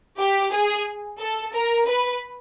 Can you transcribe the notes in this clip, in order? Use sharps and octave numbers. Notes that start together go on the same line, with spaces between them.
G4
G#4
A4
A#4
B4